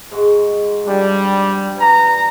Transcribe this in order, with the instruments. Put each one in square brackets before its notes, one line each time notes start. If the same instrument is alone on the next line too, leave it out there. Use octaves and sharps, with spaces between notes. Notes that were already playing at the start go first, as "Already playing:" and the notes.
[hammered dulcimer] G#2 G#3 F#4
[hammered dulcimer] F3 D4 [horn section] G3
[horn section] B4 A#5 [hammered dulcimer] G#5